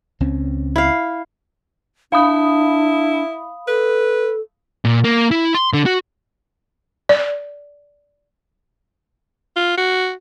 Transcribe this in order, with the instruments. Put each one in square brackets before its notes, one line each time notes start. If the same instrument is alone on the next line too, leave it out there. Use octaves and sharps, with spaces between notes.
[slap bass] C#2 C4 C#4
[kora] E4 F5
[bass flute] D4 [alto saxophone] E4 [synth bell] F5 B5 D#6
[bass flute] A4 [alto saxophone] B4
[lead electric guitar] A#2
A#3
E4
C6
D3
F#4
[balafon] D5
[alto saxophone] F4
F#4